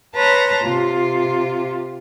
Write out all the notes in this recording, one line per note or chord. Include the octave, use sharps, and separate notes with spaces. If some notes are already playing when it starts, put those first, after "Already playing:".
B4 C#5 A5 A#5 C6
C3 F4